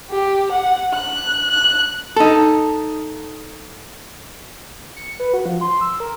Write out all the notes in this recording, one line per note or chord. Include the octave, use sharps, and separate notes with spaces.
G4
F#5
F#6
F#6
D#4 A4
C#7
B4
F#4
F3
C6
E6
A#4